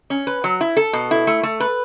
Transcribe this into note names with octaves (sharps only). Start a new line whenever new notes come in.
C#4
B4
F#3
E4
A4
B2
E4
A3
A3
B4